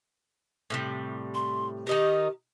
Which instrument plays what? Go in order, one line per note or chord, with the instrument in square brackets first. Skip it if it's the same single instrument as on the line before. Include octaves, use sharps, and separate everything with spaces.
[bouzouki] A2 C3 G3
[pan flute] C6
[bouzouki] D#3 D#4 A#4 [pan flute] G4